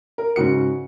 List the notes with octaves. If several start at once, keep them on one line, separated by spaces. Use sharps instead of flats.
A#4
G#2 C#3 F#4 C#7